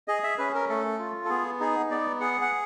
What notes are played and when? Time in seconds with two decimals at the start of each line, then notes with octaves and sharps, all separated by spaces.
0.08 G#4 D#5
0.24 E5
0.38 C#4 B4
0.55 A#4
0.69 A3 A4
0.99 F4
1.25 A4
1.29 B3 G#4
1.60 D#4 G#4
1.90 B3 D5
2.21 G#4 F#5
2.42 F#5